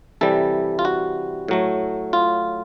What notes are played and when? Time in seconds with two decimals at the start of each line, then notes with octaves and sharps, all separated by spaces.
0.21 C3 E3 G3 A4
0.79 F4
0.85 F#4
1.48 A2 F#3 A3
2.13 F4